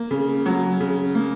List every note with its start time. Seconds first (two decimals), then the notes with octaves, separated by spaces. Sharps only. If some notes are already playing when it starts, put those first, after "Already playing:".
Already playing: A#3
0.11 C#3
0.46 F#3
0.80 C#3
1.15 A#3